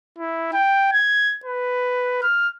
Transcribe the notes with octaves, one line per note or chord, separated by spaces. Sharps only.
E4
G5
G#6
B4
F6